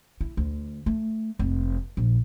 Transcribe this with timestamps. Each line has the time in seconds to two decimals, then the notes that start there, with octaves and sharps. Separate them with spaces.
0.21 E4
0.37 D2
0.86 A3
1.39 F1
1.97 A#1